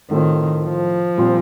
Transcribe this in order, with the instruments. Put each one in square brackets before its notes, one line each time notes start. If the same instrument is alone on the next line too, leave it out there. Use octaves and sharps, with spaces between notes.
[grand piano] A2 A3 C4 F4 [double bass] D#3
[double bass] F3
[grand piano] A#2 G3 C4 F4